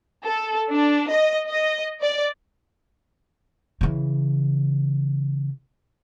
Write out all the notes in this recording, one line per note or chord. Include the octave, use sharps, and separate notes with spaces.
A4
D4
D#5
D#5
D5
C#3 E3